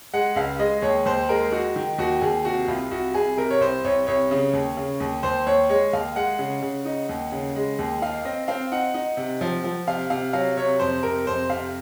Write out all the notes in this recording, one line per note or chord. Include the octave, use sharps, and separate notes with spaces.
G#3 F#5
C#2 F5
G#3 D#5
D#2 C#5
D#2 C5
G#3 A#4
D#4 F#4
D#3
D#2 F#4
D#2 G#4
C3 F#4
C2 F4
C2 F#4
C2 G#4
C3 A#4
C#5
C2 C5
C2 C#5
C2 C#5
C#3
D#2
C#3
D#2
D#2 C5
D#2 C#5
G#3 C#5
D#2 F5
G#3 F#5
C#3
C#3
D#4
D#2
C#3
G#3
D#2
D#4 F5
C4 D#5
C4 F5
D#4 F#5
D#4
C3
F3
F3
C3 F5
C3 F5
F#3 F5
C3 C#5
F2 C5
C3 A#4
F2 C5
C3 F5